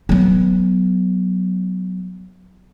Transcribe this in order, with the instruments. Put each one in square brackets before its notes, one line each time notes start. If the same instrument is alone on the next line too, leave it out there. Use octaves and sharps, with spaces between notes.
[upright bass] F#3 B3